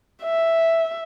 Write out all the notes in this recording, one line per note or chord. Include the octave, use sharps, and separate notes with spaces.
E5